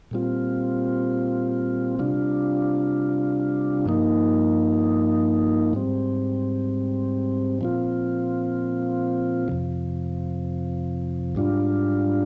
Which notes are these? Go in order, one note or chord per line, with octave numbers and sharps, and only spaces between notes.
A#2 G3 C4 F4
C3 G3 D4 F4
G2 F3 A#3 D#4
G#2 G3 C4
A#2 F3 C4 F4
F2 C3 F3
G#2 G3 D4 F4